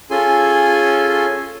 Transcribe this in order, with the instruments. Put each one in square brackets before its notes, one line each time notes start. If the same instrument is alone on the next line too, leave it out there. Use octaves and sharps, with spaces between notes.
[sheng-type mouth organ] C#4 F4 G#4 A4 G#5 C6